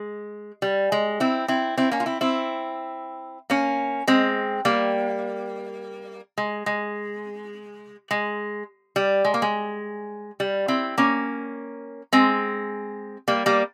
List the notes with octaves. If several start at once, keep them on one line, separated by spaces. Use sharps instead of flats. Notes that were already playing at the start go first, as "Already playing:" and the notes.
Already playing: G#3
G3
G#3
C4 E4
C4 E4
C4 E4
A#3 C#4
F4
C4 E4
C4 E4
A#3 C#4
G#3 C4
G3 A#3
G#3
G#3
G#3
G3
G#3
A#3
G#3
G3
C4 E4
A#3 C#4
G#3 C4
G3 A#3
G3 A#3